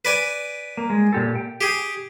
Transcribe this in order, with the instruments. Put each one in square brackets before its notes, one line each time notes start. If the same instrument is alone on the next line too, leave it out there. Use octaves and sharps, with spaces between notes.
[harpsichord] B4 D5 G#5
[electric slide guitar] A#3
G#3
A#2 G4 A4
G5
[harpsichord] G4 G#4